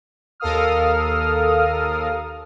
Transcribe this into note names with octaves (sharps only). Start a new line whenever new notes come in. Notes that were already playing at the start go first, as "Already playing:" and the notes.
D#2 A4 A#4 F5 D#6 F6